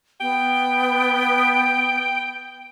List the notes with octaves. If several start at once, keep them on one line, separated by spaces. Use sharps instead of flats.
B3 G5